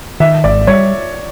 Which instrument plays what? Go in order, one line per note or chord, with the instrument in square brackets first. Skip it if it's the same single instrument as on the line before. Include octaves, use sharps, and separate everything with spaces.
[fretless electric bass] D#3 [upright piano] E5
[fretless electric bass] G#1 [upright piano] D5
[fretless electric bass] G3 [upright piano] C#5